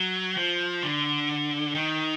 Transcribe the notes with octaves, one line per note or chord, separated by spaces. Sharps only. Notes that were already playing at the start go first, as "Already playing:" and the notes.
Already playing: F#3
F3
D3
D#3